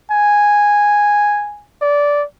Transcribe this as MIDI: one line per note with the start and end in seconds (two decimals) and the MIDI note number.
0.11 1.65 80
1.82 2.25 74